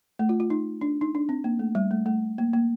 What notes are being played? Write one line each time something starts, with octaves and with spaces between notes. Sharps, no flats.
A3
F4
F4
D#4
D4
D#4
D4
C4
A#3
A3
G3
A3
A3
A#3
A#3